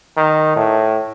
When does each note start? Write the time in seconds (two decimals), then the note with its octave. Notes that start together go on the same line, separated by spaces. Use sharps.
0.17 D#3
0.56 A2